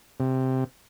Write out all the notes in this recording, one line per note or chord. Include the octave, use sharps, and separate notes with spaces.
C3